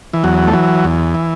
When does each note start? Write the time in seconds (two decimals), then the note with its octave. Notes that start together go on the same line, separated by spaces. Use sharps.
0.14 E3
0.24 E2 F#3
0.47 A3
0.53 E3 F#3
0.84 E2
1.15 E3